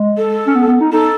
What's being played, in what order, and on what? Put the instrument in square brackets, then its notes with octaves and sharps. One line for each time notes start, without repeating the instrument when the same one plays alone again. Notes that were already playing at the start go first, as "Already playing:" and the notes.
Already playing: [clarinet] G#3
[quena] A4
[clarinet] C#4
B3
B3
D#4
[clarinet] D#4 [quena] A4